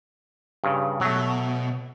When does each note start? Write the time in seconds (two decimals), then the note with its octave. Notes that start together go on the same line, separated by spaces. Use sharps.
0.64 G2 C#3
1.01 B2 F#3 A3